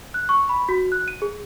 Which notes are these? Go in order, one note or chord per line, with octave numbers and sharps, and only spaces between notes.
F#6
C#6
B5
F#4
F#6
D#7
G#4